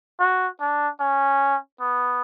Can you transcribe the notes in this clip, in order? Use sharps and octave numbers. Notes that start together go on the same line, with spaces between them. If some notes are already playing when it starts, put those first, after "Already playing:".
F#4
D4
C#4
B3